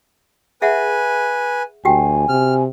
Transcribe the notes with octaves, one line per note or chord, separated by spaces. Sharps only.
G#4 B4 E5 F#5 G#5
D2 F#4 G4 G5 G#5
C3 F6